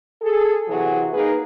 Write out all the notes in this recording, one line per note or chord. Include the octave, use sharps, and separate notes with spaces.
G#4 A4
C3 E3 F#3 F#4 G#4
A#3 D#4 G#4 A#4 B4